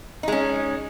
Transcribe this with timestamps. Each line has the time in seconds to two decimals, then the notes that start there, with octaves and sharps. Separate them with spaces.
0.23 D#4
0.28 G#3
0.32 C#4